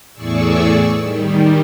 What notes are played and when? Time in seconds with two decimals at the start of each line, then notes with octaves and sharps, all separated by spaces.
0.13 E2 A2 G#4 D5 C#6 E6
0.98 D#3 G3